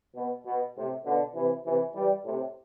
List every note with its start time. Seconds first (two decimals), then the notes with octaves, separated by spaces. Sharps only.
0.14 B2
0.44 B2
0.74 A2 C3
1.04 B2 D3
1.34 C3 E3
1.64 C3 E3
1.94 E3 G3
2.25 A2 C3